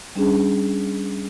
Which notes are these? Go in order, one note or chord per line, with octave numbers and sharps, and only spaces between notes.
G3 C#4 D4 G#4